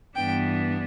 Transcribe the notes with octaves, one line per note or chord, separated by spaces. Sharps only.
G2 E3 B3 D4 G5